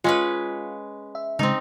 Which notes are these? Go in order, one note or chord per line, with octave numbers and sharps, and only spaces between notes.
G#3 C#4 F4 B4
E5
C#3 G#3 C4 D#4